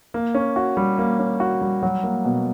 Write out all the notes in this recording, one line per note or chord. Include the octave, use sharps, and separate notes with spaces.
A#3
C#4
F#4
G3
A#3
C#4
F#4
G3
F#3
A#3
B2